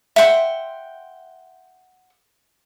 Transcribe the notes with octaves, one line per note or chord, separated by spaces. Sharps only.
E5 F#5 G5 C6